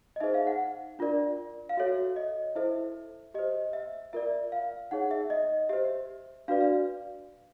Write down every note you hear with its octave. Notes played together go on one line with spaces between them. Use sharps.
D#5
D#4 G#4 C5 E5
F5
F#5
D4 F4 A#4 D5
F5
F#4 A4 C#5 E5
D#5
E4 A4 C5 E5
G4 C5 D#5
E5
F4 A#4 D5 E5
F5
D#4 G#4 C#5 F#5
E5
D#5
G4 C5 E5
D4 F#4 B4 D5 F5
F5